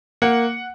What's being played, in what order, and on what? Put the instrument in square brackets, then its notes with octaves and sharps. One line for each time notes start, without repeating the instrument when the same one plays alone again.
[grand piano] A#3 F#5